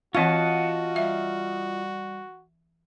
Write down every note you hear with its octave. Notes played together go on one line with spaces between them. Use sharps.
E3 C4 F4 F#4 D#5 F#5 A5 C#6
G3 E5